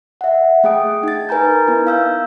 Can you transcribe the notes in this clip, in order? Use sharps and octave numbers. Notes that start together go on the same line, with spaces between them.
E5 F#5
A3 G#4 G5 D#6 D7
D#4 A6
A#4 B4 G#5 A#5 G6
B3 D#4 E4 B4
F5 E6 G6